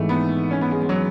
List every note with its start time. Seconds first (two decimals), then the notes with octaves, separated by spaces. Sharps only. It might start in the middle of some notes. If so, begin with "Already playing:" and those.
Already playing: G#1 G#2 E3 A3
0.09 B3
0.51 C#4
0.61 B3
0.71 G#3
0.82 G#3
0.89 F#3